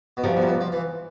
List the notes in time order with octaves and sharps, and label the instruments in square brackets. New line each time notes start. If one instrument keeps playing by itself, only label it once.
[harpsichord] B2
[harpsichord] C3 [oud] F3 G3
[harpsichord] B2
C3
B2
F3
E3